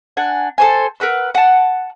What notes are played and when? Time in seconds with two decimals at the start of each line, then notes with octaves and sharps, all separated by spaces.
0.17 D4 F#5 G#5
0.58 A4 C5 G#5
1.00 A#4 B4 F#5 E6
1.35 F#5 A5